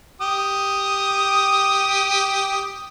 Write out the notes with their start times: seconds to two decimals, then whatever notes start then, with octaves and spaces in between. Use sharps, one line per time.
0.21 G4 D#6